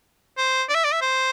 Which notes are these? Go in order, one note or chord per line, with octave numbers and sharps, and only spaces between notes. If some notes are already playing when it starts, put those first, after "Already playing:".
C5
D5
E5
D5
E5
C5